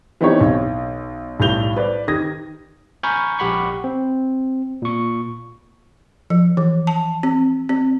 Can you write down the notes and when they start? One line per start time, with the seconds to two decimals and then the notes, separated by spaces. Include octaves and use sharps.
0.21 E3 B3 C4 D#4 G4 C#5
0.41 B1
1.40 B1 A2 G3 G6 F7 G7
1.77 B4 C5 D5
2.08 D#3 G4 D#6 G#6 A#6
3.03 G#5 A#5 B5 C#6 F6 G6
3.39 A#1 G4 F#5 B5 C#6
3.84 C4
4.82 A#2 C#6
6.30 F3
6.57 E3
6.87 A5
7.23 C4
7.69 C4